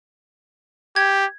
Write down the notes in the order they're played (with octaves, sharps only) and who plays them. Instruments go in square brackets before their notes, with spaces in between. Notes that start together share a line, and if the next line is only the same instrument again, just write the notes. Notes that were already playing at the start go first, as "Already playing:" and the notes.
[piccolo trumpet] G4 [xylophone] G#6